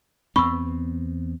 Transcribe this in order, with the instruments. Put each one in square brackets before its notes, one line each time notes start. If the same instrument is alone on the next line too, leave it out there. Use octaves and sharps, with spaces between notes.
[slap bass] E2 B3 C4 [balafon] B5 [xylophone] C#6 E6